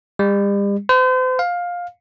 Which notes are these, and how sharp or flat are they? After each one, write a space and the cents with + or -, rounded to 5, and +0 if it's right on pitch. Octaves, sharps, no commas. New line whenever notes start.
G3 +40
C5 -40
F5 +15